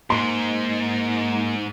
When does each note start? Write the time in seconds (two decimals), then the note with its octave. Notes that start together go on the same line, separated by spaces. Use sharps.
0.10 G#2 A#3 C6